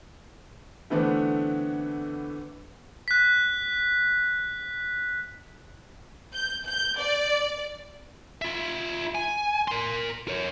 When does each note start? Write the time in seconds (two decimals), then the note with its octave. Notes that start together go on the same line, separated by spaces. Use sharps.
0.90 D3 E3 A3 B3 C4 D4
3.08 F#6 B6
6.34 G6
6.66 G6
6.99 D5
8.42 F4 E5
9.15 G#5
9.68 A#4 C6
10.28 A#4 C#5